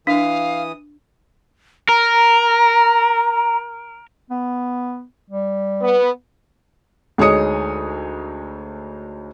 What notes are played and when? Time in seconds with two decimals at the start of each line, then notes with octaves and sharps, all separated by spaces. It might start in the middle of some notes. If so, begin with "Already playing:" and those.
0.07 E3 D4 F5 D#6
1.89 A#4 A#5
4.30 B3
5.30 G3
5.81 B3
7.18 D2 G#3 D#4 C#5 D#6 C#7